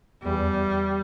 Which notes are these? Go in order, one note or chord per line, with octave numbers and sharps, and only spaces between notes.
E2 G3